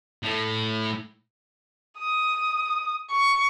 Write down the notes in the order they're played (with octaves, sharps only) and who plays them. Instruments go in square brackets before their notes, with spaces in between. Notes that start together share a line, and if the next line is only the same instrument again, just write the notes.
[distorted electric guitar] A2 A3
[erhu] D#6
C#6